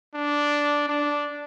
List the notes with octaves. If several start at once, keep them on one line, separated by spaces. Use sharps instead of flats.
D4
D4